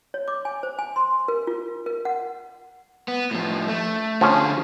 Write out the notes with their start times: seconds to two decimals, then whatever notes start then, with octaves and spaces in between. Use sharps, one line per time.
0.14 C#5
0.28 D6
0.45 G#5
0.63 C5
0.79 G#5
0.96 C6
1.28 A#4
1.47 F4
1.86 A#4
2.05 F#5
3.08 B3
3.31 A2 F3
3.68 A3
4.21 D3 F3 C#4 G#4